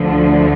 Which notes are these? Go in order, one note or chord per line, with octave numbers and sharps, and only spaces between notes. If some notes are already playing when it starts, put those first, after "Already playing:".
Already playing: D2 D3 F3